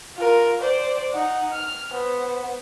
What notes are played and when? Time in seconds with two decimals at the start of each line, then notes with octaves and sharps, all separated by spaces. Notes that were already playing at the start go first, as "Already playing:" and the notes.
0.17 F4 A#4
0.60 C5 D5
1.13 D#4 F#5
1.53 F6
1.92 B3 C5